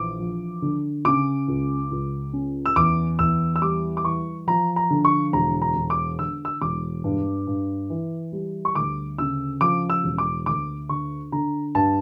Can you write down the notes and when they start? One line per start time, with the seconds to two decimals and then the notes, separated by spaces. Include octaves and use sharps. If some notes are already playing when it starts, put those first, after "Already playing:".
Already playing: A#1 E3 D6
0.20 F3
0.62 D3
1.05 C#3 D6
1.48 C#2
1.91 C#2
2.33 C#4
2.66 E6
2.76 E2 D6
3.19 E2 E6
3.56 E6
3.62 G3 D6
3.97 D6
4.05 E3 C#6
4.47 F3 A#5
4.76 A#5
4.90 D3
5.05 C#6
5.33 E1 A#5
5.62 A#5
5.76 E1
5.90 D6
6.19 D3 E6
6.45 E6
6.61 E1 D6
7.04 G2
7.47 G2
7.90 E3
8.32 G3
8.65 C#6
8.75 D2 D6
9.18 C#3 E6
9.61 F3 D6
9.90 E6
10.04 E1
10.18 D6
10.46 D2 D6
10.89 D3 C#6
11.32 D3 A#5
11.75 G2 A5